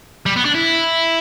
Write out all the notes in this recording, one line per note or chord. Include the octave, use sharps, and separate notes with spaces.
G3
B3
D4
E4